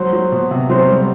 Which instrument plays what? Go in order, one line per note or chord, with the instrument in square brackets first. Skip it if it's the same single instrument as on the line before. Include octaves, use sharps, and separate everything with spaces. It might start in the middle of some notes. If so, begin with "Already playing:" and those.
Already playing: [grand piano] F#3 [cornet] C5
[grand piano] F#3
B2
C3
[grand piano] F#3 [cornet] C5
[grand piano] G3